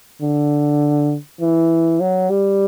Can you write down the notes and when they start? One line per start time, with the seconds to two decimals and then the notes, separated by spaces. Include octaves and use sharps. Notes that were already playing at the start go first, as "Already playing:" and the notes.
0.22 D3
1.40 E3
2.00 F#3
2.30 G3